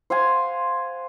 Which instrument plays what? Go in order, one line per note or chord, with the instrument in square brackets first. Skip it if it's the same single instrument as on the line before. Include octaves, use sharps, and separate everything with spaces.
[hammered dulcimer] C5 F5 F#5 G#5